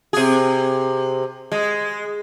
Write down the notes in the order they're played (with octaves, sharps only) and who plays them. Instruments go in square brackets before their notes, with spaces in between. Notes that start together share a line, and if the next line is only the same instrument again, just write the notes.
[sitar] C3 G#4
G#3